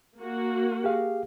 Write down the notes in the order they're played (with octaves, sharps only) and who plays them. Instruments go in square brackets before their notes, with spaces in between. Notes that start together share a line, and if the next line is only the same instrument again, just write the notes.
[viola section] A#3 F#4
[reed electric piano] G4 G#4 F5